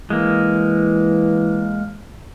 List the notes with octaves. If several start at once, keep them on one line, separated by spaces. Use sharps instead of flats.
E3 G#3 A#3